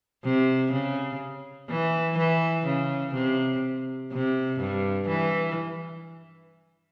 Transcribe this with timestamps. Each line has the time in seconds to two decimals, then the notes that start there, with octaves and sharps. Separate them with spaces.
0.25 C3
0.73 C#3
1.70 E3
2.18 E3
2.66 C#3
3.15 C3
4.12 C3
4.60 G2
5.09 E3